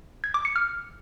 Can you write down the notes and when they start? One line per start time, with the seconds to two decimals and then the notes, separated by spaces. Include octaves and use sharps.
0.24 G#6
0.34 D6
0.45 C#7
0.56 F6